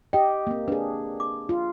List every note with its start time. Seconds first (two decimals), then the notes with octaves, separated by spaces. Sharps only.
0.13 G4 D#5 G5
0.47 A#3 C4
0.68 D4 G#4 B4
1.20 D6
1.49 F4